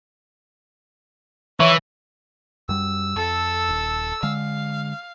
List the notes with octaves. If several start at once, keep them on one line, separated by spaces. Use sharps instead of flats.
E3 C#5 E5
F#2 G3 E6
F2 A4
D#1
D3 G#3 F5